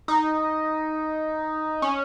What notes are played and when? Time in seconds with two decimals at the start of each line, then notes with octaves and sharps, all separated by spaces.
0.08 D#4
1.82 C#4